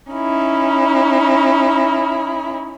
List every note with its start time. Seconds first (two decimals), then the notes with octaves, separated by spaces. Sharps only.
0.11 C#4 D#4 E4